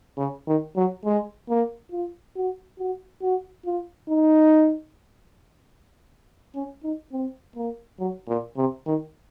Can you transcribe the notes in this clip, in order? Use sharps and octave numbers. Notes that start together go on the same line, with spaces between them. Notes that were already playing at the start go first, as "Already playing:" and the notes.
C#3
D#3
F#3
G#3
A#3
F4
F#4
F#4
F#4
F4
D#4
C#4
D#4
C4
A#3
F#3
A#2
C3
D#3